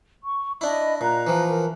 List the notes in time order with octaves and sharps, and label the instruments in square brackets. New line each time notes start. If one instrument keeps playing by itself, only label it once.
[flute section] C#6
[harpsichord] D4 E4 [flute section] D#5 B5
[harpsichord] A#2 [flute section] A#5 F#6
[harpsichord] E3 F3
[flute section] A#4